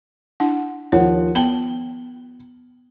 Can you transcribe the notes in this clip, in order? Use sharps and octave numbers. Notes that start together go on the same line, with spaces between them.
D4 E4 F#5
D#2 F3 C#5 F#5
B3 G5 A5 F#7 G7